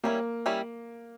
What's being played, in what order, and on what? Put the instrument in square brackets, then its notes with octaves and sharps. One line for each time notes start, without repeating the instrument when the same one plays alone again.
[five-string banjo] G3 C#4 E4 [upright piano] A#3
[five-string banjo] G3 C#4 E4